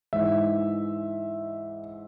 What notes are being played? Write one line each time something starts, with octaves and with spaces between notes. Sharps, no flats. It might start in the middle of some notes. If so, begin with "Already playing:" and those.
G#2 E3 G#3 E5